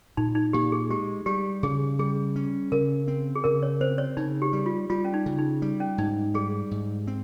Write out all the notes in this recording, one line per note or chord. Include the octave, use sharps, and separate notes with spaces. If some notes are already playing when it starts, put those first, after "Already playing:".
A#2 D#4
D#4
A#2 G4
G#4
G#3 G4
G3 G4
C#3 G#4
G3 G#4
C#4
C#3 A#4
C4
G#4
C#3 A#4
C#5
C4 C5
C#5
C#3 D#4
G4
G3
F4
G3 F4
C#4
D#4
C#3
D#4
G3
C#4
G#2 D#4
G3 G#4
G#2
C4